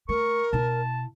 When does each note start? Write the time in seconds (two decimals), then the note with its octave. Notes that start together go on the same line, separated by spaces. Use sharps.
0.09 A3 A#4 C#6
0.53 B2 E4 A5